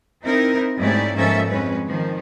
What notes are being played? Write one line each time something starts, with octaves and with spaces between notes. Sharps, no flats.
C4 D#4 E4 A#4
G#2 A3 C#4 E4 G4 D5
G#2 F3 A#3 C#4 A4 E5
F2 G#3 C#4 B4
D#3 F3